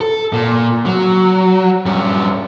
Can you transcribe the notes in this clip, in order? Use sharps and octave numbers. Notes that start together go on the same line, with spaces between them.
A4
A#2
F#3
G2 C#4